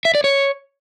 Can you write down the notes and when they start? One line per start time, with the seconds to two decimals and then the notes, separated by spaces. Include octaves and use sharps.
0.05 E5
0.15 D5
0.24 C#5